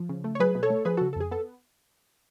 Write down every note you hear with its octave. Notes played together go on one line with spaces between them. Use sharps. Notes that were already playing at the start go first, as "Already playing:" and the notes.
Already playing: F3
C#3
A3
C#5
F#3 G#4 B4
B2
A4 C#5
A3
F3 G#4 B4
C#3 F#4 A4
A4
F2 G#4
B3 A4